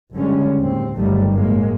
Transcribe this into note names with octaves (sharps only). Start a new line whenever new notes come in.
F#1 D3 G3 G#3 C#4
D#2 A2 C4
G1 F#2 D#3 F#3 G3 A3
A2 F#3 G#3 A#3